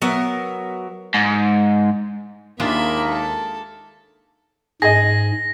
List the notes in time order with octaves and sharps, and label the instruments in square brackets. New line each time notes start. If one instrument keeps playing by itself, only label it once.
[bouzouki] F#3 B3 A#4 E5
[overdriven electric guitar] G#2
[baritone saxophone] D#2 [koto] G#3 D4 F4 [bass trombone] A#3 [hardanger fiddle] E5 B5
[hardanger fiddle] A4
[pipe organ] G#2 [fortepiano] G#4 D#5 [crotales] A#6